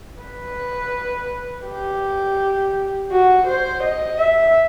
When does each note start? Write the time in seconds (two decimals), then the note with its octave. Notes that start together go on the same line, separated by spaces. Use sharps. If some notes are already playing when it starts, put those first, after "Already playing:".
0.22 B4
1.66 G4
3.11 F#4
3.47 C5
3.83 D#5
4.19 E5